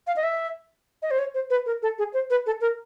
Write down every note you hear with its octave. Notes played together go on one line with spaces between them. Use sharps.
F5
D#5
E5
D#5
C5
C#5
C5
B4
A#4
A4
G#4
C5
B4
A4
A#4